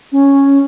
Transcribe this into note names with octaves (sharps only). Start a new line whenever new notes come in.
C#4